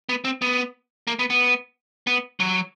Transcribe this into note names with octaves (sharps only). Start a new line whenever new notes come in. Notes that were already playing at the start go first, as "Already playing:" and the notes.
B3
C4
B3
A#3
B3
B3
B3
F#3